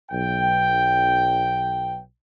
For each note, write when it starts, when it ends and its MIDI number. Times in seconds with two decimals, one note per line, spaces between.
0.11 1.99 35
0.11 1.99 79